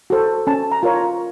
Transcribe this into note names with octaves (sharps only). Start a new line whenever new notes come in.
F#4 A4 C5
C#4 A5
A#5
F4 A#4 C#5
A#5